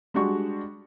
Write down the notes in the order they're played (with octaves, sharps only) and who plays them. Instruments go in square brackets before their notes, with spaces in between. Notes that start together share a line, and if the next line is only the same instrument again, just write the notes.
[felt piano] G3 G#3 D4 F#4 C#6